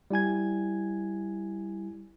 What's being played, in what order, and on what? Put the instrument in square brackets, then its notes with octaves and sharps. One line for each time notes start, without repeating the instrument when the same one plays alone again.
[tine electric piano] G3 E4 G#5 G#6